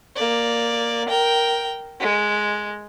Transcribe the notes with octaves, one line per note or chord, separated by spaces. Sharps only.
A#3 D5
A#4 G5
G#3